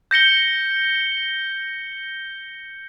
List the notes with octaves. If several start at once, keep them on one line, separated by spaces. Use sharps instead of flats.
G6 A#6 C#7 G7